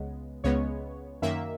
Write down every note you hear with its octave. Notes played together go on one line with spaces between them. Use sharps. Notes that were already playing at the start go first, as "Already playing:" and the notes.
Already playing: C#2 C#3 G#3 B3
C#2 C#3 G#3 B3 C#5
F#2 D#3 A#3 E5